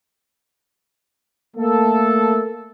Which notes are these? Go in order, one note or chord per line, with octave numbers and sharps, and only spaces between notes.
A3 A#3 A4